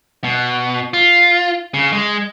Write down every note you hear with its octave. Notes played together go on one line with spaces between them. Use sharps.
B2
F4
C#3
G#3